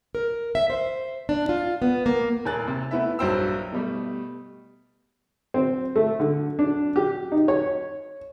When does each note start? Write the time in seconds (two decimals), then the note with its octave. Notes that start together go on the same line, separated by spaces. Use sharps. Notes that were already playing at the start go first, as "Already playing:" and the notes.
0.15 A#4
0.55 E5
0.70 C5
1.29 D4
1.49 F4
1.82 B3
2.06 A#3
2.45 D#1 A#4 G#5 F#6 A6
2.68 C3
2.91 A3 B3 E4 E5
3.19 A#1 G2 F#3 C5 G5 E6
3.72 B2 G3 A3
5.54 C4
5.96 A3
6.20 D3
6.59 D4
6.96 G4
7.32 D#4
7.48 C#5